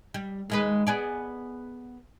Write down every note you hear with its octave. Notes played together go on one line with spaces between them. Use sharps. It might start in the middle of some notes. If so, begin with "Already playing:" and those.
G3
D#2 G#3 B4
B3 G#4 D5